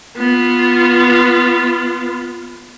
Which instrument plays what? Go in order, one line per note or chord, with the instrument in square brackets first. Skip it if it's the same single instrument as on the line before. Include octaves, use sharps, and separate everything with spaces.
[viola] B3 F4